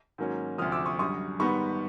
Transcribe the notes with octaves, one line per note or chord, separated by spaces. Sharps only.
G#2 D#3 F#3 A#3 C#4
D2 C3 F3 D#6 F6
D6 E6
C#6 D#6
F#2 D3 G3 C#6 D#6
G#2 D#3 G3 B3 B5 C#6